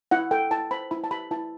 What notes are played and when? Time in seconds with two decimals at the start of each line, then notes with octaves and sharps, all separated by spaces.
0.11 E4 F#5
0.31 A4 G5
0.51 E4 A5
0.71 C5 B5
0.91 E4 B5
1.04 A5
1.11 G4 B5
1.31 E4 A5